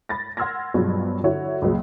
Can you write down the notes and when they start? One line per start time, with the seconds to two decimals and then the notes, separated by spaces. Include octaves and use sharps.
0.09 B5 A6 A#6
0.37 F#5 C6 E6 F6 G#6 A#6
0.74 G2 B2 F3 F#3 G#3
1.24 D3 E4 F#4 C#5
1.62 C#2 A#2 F#3 G#3